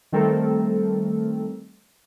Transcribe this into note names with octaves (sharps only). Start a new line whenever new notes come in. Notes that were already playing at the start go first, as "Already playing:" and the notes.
D#3 G3 A3 C4 A4 A#4